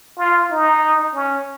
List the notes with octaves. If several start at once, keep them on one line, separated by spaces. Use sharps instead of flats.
F4
D#4
C#4